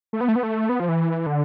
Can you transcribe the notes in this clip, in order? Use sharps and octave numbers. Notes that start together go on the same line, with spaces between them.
A3
B3
A3
B3
A3
B3
F3
E3
D3